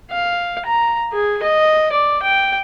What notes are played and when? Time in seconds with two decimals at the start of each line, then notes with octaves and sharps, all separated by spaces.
0.11 F5
0.66 A#5
1.12 G#4
1.43 D#5
1.92 D5
2.23 G5